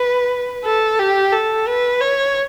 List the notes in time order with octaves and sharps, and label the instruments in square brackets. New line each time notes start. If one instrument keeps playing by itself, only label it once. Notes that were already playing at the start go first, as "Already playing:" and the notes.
Already playing: [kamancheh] B4
A4
G4
A4
B4
C#5